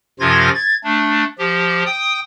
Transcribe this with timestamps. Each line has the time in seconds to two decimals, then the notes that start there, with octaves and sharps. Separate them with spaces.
0.20 F#2 C3 F3 F4 G#6 A#6
0.54 G#6 A6
0.84 A3 D4
1.38 F3 G4
1.86 G5 D#6